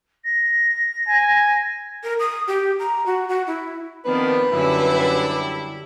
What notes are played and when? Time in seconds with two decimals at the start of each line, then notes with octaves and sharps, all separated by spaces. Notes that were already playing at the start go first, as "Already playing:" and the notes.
0.25 A#6
1.09 G#5
2.03 A#4
2.19 D#6
2.47 G4
2.79 A#5
3.06 F#4
3.28 F#4
3.47 E4
4.06 D#3 F3 B3 C4 D4 B4
4.52 F#2 D3 G3 D4 E4 G4 E5